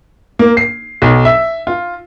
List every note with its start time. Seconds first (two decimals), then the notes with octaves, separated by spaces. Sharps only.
0.39 A#3
0.57 C7
1.02 B1
1.25 E5
1.67 F4